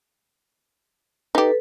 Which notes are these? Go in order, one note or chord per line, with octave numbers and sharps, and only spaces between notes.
D#4 G4 A4 B4